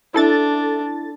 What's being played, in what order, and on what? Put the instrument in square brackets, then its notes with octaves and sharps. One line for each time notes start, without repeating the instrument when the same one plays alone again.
[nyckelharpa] D4 [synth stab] E4 A4 A6